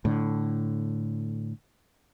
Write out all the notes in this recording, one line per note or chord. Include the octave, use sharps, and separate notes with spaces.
A2 D3